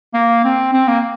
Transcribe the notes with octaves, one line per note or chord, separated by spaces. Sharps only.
A#3
C4
C4
A#3